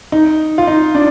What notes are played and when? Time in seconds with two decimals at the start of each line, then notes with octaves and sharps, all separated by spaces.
0.12 D#4
0.58 F4
0.67 D#4
0.95 D4